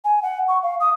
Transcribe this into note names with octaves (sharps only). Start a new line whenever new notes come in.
G#5
F#5
C#6
F5
D#6